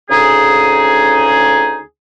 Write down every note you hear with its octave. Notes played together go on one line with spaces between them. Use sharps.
D2 C#3 D#4 G#4